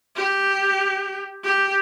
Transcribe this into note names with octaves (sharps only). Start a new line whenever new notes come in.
G4
G4